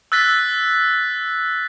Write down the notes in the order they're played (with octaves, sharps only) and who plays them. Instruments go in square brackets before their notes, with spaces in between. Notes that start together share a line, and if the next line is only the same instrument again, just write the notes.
[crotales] E6 F#6 A6 B6